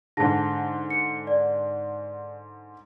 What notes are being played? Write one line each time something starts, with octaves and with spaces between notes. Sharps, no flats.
G#2 D3 G#4 A5 A#6
C#7
D5